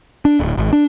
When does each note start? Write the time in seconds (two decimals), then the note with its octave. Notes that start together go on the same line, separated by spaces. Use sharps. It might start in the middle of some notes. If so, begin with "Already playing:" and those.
0.25 D4
0.40 D1
0.58 G#1
0.73 D4